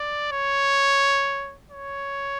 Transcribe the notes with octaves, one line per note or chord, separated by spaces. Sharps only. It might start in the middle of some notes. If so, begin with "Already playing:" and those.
Already playing: D5
C#5
C#5